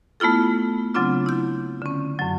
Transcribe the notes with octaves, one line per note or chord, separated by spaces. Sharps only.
A3 B3 E4 F4 A4
C#3 F#3 C4 D4 F4
E4 G6
D3 C#4
F#2 F#3